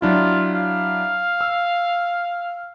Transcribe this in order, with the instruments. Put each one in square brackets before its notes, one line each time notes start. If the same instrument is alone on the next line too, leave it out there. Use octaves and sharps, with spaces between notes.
[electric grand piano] F#3 D4 E4 [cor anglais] F4
[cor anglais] F5
[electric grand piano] E6